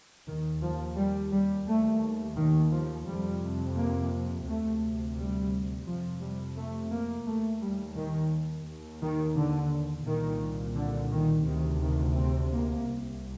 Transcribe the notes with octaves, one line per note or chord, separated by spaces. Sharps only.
D#2 D#3
F3
G3
G3
D#2 A3
D#3
F3
F2 C3 G3
A#3
D2 C3 A3
G3
F2 C3 F3
G3
A3
A#3
D#2 A3
G3
D#3
D#2
D#3
D3
C2 A#2 D#3
D3
D#3
D2 C3 D#3
D#3
C4
A#3
C2 C3